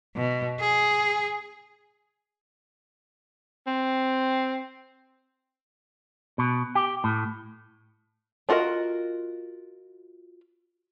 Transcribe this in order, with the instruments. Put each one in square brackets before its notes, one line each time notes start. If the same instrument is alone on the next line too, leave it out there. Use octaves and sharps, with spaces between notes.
[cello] B2
G#4
[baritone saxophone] C4
[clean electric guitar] B2
G4
A2
[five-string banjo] D4 F4 F#4 A#4 D#5